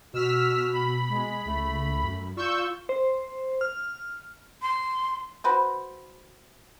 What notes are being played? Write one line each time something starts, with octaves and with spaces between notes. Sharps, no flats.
B2 F#4 E6 F6 B6
B5
G#3
C#2 A3
F#2
F4 D5 C#6 E6 G6
C5
F6
C6
F#4 B4 C5